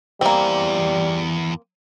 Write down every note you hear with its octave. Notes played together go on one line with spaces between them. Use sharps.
E2 E3 G3 A#3 C4